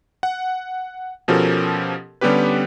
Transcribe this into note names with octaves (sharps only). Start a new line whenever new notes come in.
F#5
B2 F3 C#4 G4 A4 A#4
D3 G3 B3 C#4 G4 B4